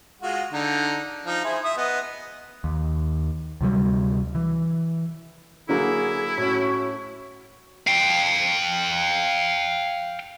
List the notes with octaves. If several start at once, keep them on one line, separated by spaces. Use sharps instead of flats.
G#3 F4 F#4
D3 D#4
F3 D#4
E4 G#4 C5
E5 D#6
B3 D#5
D#2
D2 C3 F#3 G3
E3
D3 F#3 A#3 E4 G#4
A2 C#4 F#4
F5 G5